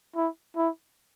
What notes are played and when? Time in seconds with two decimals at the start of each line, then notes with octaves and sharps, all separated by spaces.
0.16 E4
0.56 E4